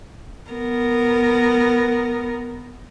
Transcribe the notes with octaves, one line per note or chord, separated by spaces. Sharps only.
B3 A#4